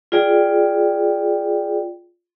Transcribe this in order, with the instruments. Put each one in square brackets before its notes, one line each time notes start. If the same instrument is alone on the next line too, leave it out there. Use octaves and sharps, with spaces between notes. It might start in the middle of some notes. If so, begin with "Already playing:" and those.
[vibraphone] F4 G#4 D5 G5